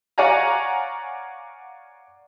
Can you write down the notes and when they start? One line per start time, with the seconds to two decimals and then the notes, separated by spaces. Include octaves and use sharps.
0.18 C#5 D5 F5 F#5 G#5 A#5